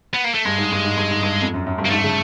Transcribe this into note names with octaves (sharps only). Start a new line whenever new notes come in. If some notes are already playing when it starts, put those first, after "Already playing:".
B3
A#3
A3
G2 G#3
G#2
G2
G#2
G2
G#2
G2
F2
F#2
F#2
G2
A#3
G#2 A3
C#3